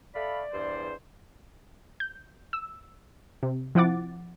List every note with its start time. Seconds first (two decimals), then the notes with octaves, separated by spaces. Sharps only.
0.15 A3 D5 F5 B5
0.53 E2 G2 C5
2.00 G6
2.53 E6
3.43 C3
3.75 F3 C4 E4 F#5 D6 A6